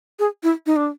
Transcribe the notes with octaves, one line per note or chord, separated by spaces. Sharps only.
G#4
E4
D#4
D4